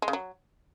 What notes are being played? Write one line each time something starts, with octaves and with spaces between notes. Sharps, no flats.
G#3
C#3
F#3